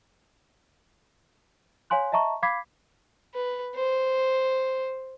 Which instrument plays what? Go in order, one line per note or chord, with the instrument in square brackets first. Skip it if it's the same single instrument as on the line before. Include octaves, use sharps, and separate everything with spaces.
[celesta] C#5 F5 G#5 C6 F#6
D#5 E5 A5 A#5 C#6
F5 B5 D6 G#6 B6 C7
[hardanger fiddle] B4
C5